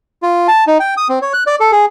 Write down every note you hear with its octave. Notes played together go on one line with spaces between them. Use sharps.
F4
A5
D#4
G5
D#6
C4
C#5
F#6
D5
A4
G#4